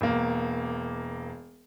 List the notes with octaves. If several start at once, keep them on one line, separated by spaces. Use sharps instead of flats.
E1 A#3